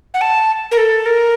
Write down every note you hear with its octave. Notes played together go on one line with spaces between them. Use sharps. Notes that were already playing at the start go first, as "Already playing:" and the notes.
F#5
A5
A#4
A4
A#4